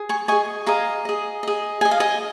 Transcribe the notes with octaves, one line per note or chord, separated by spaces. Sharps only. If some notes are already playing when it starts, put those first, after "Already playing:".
Already playing: G#4
G#5 C#6
G#4 D#5 G#5 C#6
G#4 D#5 F5 A#5
G#4 D#5
G#4 D#5
G#4 D#5 G#5
F5
D#5 G#5